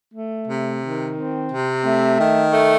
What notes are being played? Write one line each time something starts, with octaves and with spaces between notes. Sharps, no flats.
A3
C3
D#3
C4
C3
A3
D#3
A3